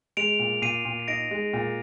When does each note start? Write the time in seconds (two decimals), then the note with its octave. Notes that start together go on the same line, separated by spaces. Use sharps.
0.17 G#3 D7 F7
0.39 A#2
0.62 A#2 C7 D#7
0.85 A#2
1.00 C7
1.08 D#4 A#6 D7
1.31 G#3
1.53 A#2